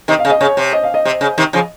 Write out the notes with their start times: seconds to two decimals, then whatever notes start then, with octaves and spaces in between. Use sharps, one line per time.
0.08 C3 D#3 D#5
0.19 F5
0.25 C#3
0.30 D#5
0.41 C#3 C#5
0.57 C3
0.73 D#5
0.84 F5
0.94 D#5
1.05 C3
1.21 C#3
1.38 C3 D#3
1.53 C#3 F3